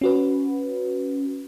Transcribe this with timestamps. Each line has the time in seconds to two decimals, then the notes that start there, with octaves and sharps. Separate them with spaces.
0.01 C#4 F#4 B4